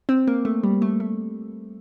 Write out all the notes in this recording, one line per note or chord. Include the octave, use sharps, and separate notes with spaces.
C4
A#3
A3
G3
A3
A3